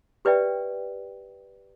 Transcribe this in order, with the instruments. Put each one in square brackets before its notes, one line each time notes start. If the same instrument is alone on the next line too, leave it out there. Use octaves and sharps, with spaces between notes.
[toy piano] G4 B4 D5 E5 G5